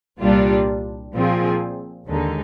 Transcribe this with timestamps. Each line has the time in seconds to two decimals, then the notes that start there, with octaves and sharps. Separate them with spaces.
0.21 C2 A#2 G3 D4 F4
1.14 A#2 F3 C4 F4 G#4
2.07 D#2 D3 G#3 D#4